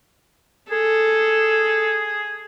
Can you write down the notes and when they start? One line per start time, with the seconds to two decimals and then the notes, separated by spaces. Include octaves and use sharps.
0.71 G#4 A4